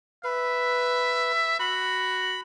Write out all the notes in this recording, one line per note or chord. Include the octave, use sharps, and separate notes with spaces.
B4 E5
F#4 B5